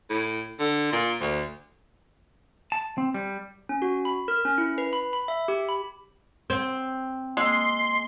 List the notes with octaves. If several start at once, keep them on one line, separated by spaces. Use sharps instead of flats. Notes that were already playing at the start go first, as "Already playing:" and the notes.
A2
D3
A#2
D2
A5
C4
G3
C#4
F#4
B5
A#4
C#4
E4
B4
B5
B5
E5
G4
B5
C4
G#3 A#3 C6 E6